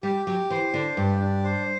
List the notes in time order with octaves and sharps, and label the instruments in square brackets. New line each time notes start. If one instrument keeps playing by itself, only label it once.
[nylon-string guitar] G3 [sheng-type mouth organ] G4
[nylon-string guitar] F#3 [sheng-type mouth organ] G4
[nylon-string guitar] E3 [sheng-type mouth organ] C5
[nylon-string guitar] D3 [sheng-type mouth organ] D4
[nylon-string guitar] G2 [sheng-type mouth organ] G4
[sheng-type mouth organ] D4
C5